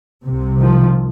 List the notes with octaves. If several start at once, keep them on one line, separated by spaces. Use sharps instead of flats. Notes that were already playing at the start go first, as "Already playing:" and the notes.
C2 C3
D#3 F3